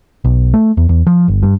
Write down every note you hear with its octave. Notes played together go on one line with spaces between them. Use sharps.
B1
A3
E2
E2
F3
G1
G2